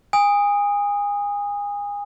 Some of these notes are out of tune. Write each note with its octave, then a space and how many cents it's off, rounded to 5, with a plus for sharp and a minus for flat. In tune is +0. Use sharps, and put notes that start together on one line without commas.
G#5 -30 D#6 +0